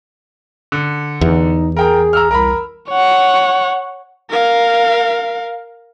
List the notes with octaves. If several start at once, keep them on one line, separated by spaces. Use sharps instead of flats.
D3
E2 D#4
G#4 A#4 G5 A#5
A#5 E6 F6
C2 A#4 A#5 B5
C#5 F#5
A#4 F5